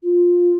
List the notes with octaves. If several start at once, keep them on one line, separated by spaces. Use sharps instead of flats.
F4